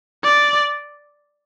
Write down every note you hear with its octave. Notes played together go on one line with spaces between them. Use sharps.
D5